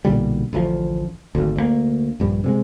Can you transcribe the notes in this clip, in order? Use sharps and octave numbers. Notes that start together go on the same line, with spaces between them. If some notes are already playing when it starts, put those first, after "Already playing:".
B1 A#2 D3 G3
A1 D2 E3 F3
G#1 D2
D2 B2 A#3
A#1 G2
C3 G3 G#3